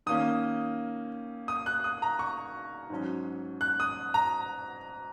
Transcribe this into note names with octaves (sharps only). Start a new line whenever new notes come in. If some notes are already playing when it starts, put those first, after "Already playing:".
D#3 A#3 C#4 D#6
D#6
F#6
D#6
A#5
C#6
G#2 F#3 C#4
F#6
D#6
A#5